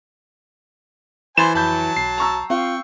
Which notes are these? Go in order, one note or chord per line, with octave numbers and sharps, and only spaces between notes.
E3 C5 G#5 B5 C6 A6 E7
F2 F#3 A5 B5 G6
B1 C7
A#5 C#6 E6
C4 F4 G5 C#6